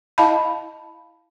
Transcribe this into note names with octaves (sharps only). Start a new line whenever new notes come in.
E4 D#5 F5 A5 B5